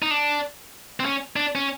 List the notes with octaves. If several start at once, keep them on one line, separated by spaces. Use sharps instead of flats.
D#4
D4
C4
C#4
D4
C#4